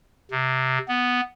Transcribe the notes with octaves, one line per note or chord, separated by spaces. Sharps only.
C3
B3